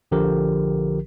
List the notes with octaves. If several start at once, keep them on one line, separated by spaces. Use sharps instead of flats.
A#1 D3 F3 G4 A#4